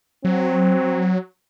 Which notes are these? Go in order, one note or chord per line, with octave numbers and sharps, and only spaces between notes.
F#3 C4